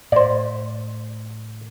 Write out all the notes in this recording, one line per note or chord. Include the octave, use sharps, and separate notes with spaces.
A2 C5 D5